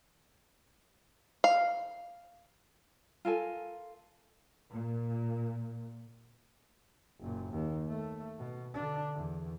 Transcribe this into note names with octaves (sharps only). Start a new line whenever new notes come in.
F5
F4 A4 A#4 G#5
A#2
F#1 A#2
D#2
A3
B2
D3 D4
E2